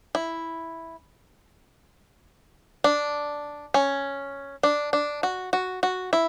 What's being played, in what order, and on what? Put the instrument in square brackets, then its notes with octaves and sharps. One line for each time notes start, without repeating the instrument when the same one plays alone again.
[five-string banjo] E4
D4
C#4
D4
D4
F#4
F#4
F#4
E4